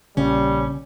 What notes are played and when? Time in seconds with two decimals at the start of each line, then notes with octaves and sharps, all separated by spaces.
0.17 A#1 C#3 G3 C#4